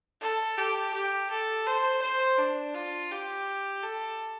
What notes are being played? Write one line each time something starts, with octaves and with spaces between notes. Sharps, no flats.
A4
G4
G4
A4
C5
C5
D4
F4
G4
A4